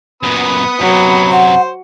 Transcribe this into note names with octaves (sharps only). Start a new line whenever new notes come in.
F#2 A#2 B3 B5 D#6
F#2 C3 F#3
C5 F#5